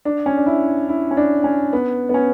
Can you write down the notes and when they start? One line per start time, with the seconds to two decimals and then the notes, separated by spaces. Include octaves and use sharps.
0.05 D4
0.26 C#4
0.37 D4
0.46 E4
0.89 E4
1.11 C#4
1.17 D4
1.44 C#4
1.73 B3
2.09 B3
2.14 C#4